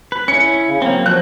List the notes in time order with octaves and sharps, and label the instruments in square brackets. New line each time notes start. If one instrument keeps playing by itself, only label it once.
[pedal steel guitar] B4
[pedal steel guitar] C#4 E4 [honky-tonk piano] C#7
[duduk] C#3
[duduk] F#3 [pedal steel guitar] A#3 C4
[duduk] F3 [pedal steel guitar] F#3 F#4 [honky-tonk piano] F#6